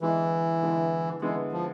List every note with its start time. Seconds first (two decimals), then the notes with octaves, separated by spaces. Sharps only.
0.01 D3 E3 G#3 B3 E4
0.62 D3 G#3 B3 E4
1.22 D3 E3 G#3 B3 E4
1.52 F3